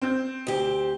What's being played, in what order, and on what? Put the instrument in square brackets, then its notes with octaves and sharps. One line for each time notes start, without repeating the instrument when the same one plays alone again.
[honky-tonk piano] C4 G6
[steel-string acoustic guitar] D2 G4